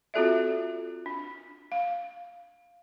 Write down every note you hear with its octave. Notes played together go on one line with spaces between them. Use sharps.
C4 F4 F#4 A4 D5 E5
D4
F5